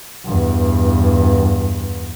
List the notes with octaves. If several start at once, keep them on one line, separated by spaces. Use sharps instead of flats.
E2 G2